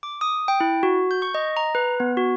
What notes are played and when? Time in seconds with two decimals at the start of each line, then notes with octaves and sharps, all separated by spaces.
0.03 D6
0.21 D#6
0.48 G5
0.60 E4
0.83 F#4
1.11 G6
1.22 C#6
1.35 D#5
1.57 A#5
1.75 B4
2.00 B3
2.17 F#4